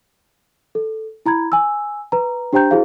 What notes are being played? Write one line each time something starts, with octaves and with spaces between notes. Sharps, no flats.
A4
E4 A#5 B5 G#6
G#5 E6
B4 A#5
D4 G4 C5 G5 A#5 G6
E4 F#4 G#4 C5 F5